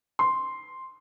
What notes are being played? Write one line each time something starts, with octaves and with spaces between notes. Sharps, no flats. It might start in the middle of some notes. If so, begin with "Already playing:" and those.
C6